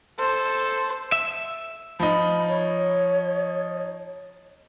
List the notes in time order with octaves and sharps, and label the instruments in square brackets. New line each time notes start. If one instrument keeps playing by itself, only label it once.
[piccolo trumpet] A4 [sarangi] C5
[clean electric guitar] E5
[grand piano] F3 D#4 [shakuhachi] B5
[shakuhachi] C#5